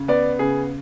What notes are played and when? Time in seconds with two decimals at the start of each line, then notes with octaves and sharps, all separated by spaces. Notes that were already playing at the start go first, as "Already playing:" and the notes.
Already playing: C#3
0.08 B3 D5
0.39 C#3 G#4